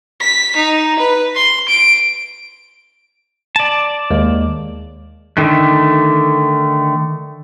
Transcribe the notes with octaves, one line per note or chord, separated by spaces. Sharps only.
B6
D#4
B4
C6
D7
D5 A5
D#2 G#3
D3 D#3 A3